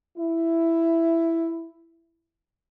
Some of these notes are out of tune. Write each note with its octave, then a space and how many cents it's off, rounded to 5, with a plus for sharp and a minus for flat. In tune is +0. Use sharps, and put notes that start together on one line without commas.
E4 +10